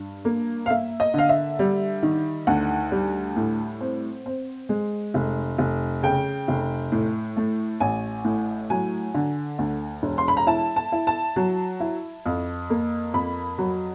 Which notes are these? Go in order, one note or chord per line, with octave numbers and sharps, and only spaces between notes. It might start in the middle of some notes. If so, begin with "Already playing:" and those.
Already playing: G2
A#3
F5
A#3 E5
D#5
D3 F5
E5
G3
D#3
D2 F#5
G3
A2
C4
C4
G#3
F1
F1
C#3 G5
F1
A2
A3
A1 G#5
A2
F#3 G#5
D3
D2
E1
C6
B5
A#5
E4 A5
A5
E4
A5
F#3
E4
F2
A#3
F2 B5
F#3